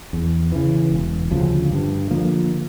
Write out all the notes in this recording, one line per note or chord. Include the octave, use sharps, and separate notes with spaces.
E2
C#3 E3
E1
D2 C#3 F3
G2
D3 F3 A#3